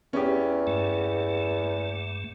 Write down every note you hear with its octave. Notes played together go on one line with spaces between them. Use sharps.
E2 C#4 G4
G2 A3